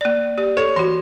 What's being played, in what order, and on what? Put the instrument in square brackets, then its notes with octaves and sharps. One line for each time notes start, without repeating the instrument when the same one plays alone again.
[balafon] A#3 D5
G4 D5
[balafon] A4 [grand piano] C#5
[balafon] E3 F#4 [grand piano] C6